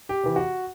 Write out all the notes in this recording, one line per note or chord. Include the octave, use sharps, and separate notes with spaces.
G4
C3 E3
F#4